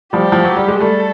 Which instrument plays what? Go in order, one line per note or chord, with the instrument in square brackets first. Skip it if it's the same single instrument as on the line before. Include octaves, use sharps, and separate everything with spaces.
[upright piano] F3 G3 [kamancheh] G4
[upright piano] F3
F#3
G3
G#3
[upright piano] G3 A3 [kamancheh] A4